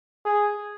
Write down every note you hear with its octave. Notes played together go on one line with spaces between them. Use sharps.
G#4